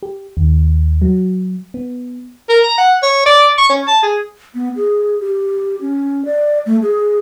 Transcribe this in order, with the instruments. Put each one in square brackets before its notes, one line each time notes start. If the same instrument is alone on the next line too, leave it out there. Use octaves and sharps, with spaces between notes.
[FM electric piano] G4
D#2
F#3
B3
[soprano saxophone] A#4
A#5
F#5
C#5
D5
C#6
C#4
A5
G#4
[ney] B3
G#4
G4
C#4
D5
A3
G#4